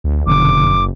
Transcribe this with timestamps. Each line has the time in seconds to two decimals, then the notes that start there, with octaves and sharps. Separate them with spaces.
0.04 D2
0.27 F#1 F2 B2 D3 D6